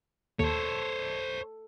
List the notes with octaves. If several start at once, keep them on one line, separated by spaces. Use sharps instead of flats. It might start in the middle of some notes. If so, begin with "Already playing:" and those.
D#2 A4 C5 C#5